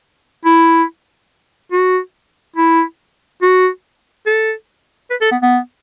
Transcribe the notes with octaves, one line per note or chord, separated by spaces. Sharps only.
E4
F#4
E4
F#4
A4
B4
A4
B3
B3